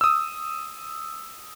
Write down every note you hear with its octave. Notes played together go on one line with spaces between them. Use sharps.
D#6 E6